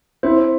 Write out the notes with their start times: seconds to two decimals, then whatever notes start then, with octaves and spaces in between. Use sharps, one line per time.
0.23 C4 E4 C5
0.38 C5